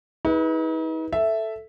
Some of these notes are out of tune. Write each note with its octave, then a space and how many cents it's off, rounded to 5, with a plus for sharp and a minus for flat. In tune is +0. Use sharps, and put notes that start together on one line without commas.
D#4 +45 G#4 -15 B4 -15
A4 +0 E5 +0